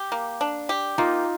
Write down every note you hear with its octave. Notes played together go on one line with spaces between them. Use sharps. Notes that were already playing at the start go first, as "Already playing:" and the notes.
Already playing: G4
A#3
D4
G4
A#3 D#4 F4